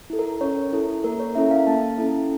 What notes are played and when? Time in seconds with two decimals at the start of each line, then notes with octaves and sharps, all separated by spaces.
0.10 E4 A4
0.19 A#4
0.41 C#4 C#5
0.73 E4 A4
1.04 A#3 A#4
1.20 C#5
1.35 C#4 E4 A4 E5
1.51 F5
1.67 A#3 A5
1.98 C#4 E4 A4